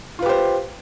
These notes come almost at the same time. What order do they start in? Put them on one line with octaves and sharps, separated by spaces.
F4 B4 G4 C5